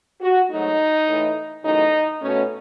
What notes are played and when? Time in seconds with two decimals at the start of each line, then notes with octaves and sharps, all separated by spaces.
0.21 F#4
0.49 G#2 F#3 A3 D#4
1.08 A2 E3 A3
1.65 F#2 C#3 E3 A3 D#4
2.22 B2 A3 C#4